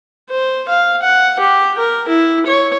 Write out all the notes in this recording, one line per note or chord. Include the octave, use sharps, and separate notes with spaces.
C5
F5
F#5
G4
A#4
E4
C#5